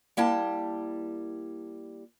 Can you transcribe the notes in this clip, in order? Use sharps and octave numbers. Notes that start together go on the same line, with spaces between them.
G3 A#3 E4 G5 A5